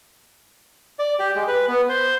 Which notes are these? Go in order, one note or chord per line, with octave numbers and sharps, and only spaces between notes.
D5
G4
G#3
B4
B3
C5